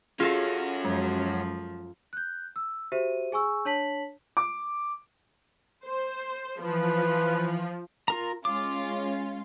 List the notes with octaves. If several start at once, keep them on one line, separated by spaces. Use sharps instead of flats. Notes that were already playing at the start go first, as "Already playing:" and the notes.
C#4 F4 F#4 G#4 A4 F5 A#6
F#2 F3 G#3
F#6 G6
E6
F#4 G4 C5 E5 D#7
G#4 G#5 C#6 E6
D4 C#5 A5 B6 F#7
D6
C5
E3 F3 B4
F4 A#4 A#5
G#3 C#4 F4 D6